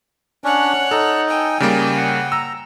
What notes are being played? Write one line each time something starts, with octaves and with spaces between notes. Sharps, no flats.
C#4 D4 C#5 F#5
D#4 A4
G5 G#5
C#3 G3 A#3 D5
F#5
A#5 E6